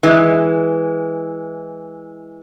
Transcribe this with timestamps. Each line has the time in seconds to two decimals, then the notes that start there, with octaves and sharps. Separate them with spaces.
0.03 E3 G#3